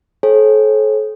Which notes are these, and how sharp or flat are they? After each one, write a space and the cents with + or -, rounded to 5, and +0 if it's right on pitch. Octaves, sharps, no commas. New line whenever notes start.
A4 -40 C#5 -45 G#5 -45